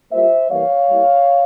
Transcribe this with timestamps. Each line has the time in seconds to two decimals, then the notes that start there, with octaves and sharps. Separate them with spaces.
0.12 G3 A#3 F4 C5 E5
0.50 E3 G3 A#3 C#5 F5
0.89 G3 A#3 E4